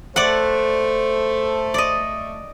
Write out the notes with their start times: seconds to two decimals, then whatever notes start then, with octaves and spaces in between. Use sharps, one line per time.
0.16 A3 C5 D5 F#5
1.74 D5 D#5